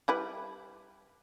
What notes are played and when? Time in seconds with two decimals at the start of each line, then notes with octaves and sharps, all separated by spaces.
0.08 G3 E4 B4